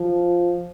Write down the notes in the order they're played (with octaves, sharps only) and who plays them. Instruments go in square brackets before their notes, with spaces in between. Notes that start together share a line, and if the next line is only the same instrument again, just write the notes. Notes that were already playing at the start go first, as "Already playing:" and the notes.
Already playing: [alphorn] F3